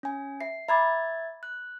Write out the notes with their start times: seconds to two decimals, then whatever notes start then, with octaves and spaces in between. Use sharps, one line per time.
0.03 C#4 G#5
0.41 E5 C7
0.69 E5 A#5 B5 D6 G#6 A6
1.43 F#6